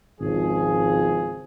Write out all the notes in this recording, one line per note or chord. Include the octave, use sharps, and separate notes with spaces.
G#1 C#2 F3 G#4